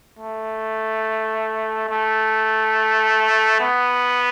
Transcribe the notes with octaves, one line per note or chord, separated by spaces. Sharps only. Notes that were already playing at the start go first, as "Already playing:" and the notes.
A3
A3
B3